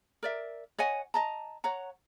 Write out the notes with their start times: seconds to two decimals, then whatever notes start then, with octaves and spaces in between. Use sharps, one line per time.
0.23 A#4 D5 E5
0.78 C#5 D#5 F#5 G#5
1.14 D#5 A5 A#5
1.64 C#5 F#5 A#5